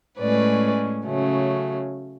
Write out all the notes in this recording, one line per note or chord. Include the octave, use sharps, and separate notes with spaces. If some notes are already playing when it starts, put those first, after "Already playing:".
A2 G#3 C#4 B4 D5
C#3 F#3 A3 C#4